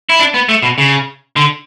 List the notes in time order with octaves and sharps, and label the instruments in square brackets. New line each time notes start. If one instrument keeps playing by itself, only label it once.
[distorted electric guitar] E4
D4
B3
A3
B2
C#3
D3